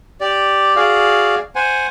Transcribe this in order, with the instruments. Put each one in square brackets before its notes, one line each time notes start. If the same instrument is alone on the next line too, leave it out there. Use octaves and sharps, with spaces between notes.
[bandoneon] G4 D5
F#4 G#4 D5 F5
C5 F#5 G#5